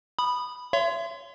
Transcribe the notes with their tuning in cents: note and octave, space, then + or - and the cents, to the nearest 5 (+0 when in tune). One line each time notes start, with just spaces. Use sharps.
B5 +0 D#6 -20
C#5 +20 E5 +35 C6 -20